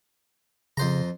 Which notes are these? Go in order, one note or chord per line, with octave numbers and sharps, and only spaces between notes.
F2 C#3 C5 A#5